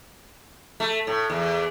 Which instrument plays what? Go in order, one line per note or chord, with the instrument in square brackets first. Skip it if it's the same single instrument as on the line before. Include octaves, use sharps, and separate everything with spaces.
[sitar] A3
A2
E2